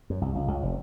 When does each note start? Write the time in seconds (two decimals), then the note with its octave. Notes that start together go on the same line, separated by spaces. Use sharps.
0.10 F#2
0.21 C2
0.35 C#2
0.48 C#2
0.63 F1